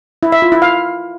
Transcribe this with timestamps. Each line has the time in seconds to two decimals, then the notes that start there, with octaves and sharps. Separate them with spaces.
0.23 E4
0.32 E5
0.42 F4
0.52 E4
0.62 F5